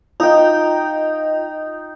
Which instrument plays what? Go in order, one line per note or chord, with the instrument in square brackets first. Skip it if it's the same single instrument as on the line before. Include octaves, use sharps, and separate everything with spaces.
[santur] D#4 G5 [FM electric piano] F4 D#5